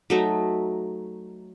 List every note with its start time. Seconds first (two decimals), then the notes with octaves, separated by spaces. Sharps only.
0.10 F#3 A3 D#4